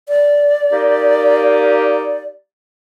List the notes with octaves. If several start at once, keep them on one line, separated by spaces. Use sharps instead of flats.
D5
A#3 D#4 G4